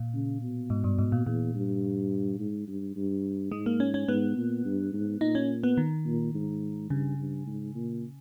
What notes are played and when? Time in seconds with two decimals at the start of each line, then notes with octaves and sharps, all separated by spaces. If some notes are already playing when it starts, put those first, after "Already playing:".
Already playing: A#2
0.14 C#3
0.42 B2
0.70 G#2
0.84 G2
0.99 G#2
1.12 A#2
1.26 E2 A#2
1.55 G2
2.39 G#2
2.67 G2
2.96 G2
3.51 G#2 G#3
3.66 A#3
3.80 C#4
3.94 C#4
4.08 G#2 B3
4.36 A#2
4.65 G2
4.93 G#2
5.21 A#2 D#4
5.35 C#4
5.63 B3
5.77 D#3
6.06 A#2
6.34 G#2
6.90 G2 C#3
7.18 G2
7.46 G#2
7.75 A#2